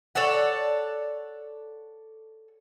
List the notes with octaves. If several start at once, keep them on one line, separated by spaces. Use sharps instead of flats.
A4 C#5 D5 F#5